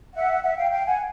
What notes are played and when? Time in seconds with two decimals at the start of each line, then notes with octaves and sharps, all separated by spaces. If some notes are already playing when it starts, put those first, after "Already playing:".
0.14 E5 F#5
0.43 E5 F#5
0.56 F5 G5
0.71 F5 G5
0.85 F#5 G#5